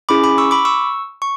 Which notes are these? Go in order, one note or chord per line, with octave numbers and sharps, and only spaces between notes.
C#4 E4 G#4 B5 D6
B5 D6
C#6 E6
B5 D6
C#6 E6
C#6